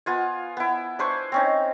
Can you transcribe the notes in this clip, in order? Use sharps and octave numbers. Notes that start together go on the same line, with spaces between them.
B3 F4 G#5
B3 E4
D4 B4 C5 C#6
C4 C#4 D#4